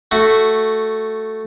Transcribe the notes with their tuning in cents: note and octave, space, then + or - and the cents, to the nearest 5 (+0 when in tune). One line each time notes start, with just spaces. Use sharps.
A3 +0 F#4 +0